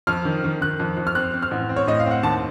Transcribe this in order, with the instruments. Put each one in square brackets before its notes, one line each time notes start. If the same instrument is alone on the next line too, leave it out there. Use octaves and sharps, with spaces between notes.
[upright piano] F2 F6
D#3
D#3
D#3 F#6
F2
F2
F6
C4 F#6
C4
F6
A1
C4
C#5
A2 D#5
F5
C4 F#5
D#2 A5